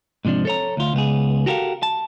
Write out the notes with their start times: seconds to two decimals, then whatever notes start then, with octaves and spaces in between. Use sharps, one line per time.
0.25 G#2 C3 F3 D4
0.45 A4 C#5 A#5
0.77 D2 F4
0.94 C#2 B3 G#4
1.46 F#4 G4 A4 A#4 C5 F5
1.83 A5